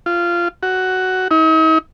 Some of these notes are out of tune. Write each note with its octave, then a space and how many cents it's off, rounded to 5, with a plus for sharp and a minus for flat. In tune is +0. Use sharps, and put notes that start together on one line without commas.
F4 -15
F#4 +10
D#4 +45